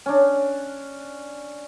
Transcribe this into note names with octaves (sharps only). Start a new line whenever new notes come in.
C#4 D4